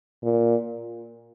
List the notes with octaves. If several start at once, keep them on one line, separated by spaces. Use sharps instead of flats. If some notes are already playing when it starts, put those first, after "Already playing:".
A#2